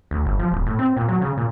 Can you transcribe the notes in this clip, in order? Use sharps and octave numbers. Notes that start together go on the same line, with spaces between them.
D2
G1
F3
D1
A2
C4
A#2
F#3
C#3
A#2